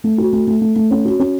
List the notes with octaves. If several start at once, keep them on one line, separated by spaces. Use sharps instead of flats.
A3
F#4
A3
A3
A3
A3
C#4
F#4
C#4